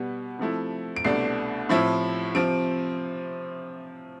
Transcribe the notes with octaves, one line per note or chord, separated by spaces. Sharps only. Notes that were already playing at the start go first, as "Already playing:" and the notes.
Already playing: B2 G3 B3
C3 F3 A3 E4
D7
C2 B2 A3 D4 C7
A2 F3 C4 E4
C3 F3 C4 D7